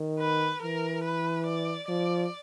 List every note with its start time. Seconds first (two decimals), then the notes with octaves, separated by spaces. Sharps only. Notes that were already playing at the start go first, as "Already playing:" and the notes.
Already playing: D#3
0.20 B4
0.62 E3 A#4
1.04 B4
1.46 D5
1.88 F3 D5